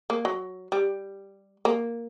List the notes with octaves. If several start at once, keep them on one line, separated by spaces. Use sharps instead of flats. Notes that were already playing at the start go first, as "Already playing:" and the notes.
A#3
F#3
G3
A#3